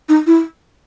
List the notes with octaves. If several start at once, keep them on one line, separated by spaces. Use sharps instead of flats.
D#4
E4